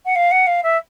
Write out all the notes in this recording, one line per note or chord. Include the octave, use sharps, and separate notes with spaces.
F#5
F5
F#5
F5
E5